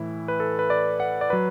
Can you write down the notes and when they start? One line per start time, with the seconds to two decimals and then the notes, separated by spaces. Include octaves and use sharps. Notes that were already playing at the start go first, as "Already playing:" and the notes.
Already playing: A2 E3 E4
0.28 B4
0.40 A4
0.59 B4
0.70 D5
1.00 F#5
1.21 D5
1.30 F#3 B4